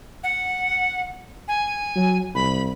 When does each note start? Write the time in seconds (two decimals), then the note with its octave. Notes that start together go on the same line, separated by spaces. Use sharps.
0.24 F#5
1.48 G#5
1.96 F#3
2.35 C2 B5